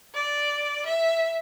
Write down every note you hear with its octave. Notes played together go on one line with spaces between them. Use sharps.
D5
E5